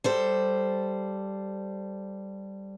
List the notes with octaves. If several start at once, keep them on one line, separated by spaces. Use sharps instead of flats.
G3 A4 C5